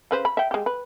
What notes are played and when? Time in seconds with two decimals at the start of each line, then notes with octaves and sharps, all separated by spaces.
0.11 C#3 B4 C5
0.25 B5
0.37 E5 G5
0.51 G#3 G4
0.66 B4